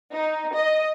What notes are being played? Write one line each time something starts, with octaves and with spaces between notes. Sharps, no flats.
D#4
D#5